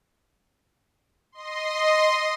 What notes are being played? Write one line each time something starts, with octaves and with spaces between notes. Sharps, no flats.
D#5 C6